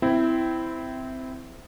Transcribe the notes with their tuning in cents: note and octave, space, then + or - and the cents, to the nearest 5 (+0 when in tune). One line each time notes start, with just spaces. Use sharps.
C4 -15 E4 +0